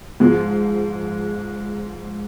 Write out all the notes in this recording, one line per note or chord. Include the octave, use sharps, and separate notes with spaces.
G#2 F3 G#3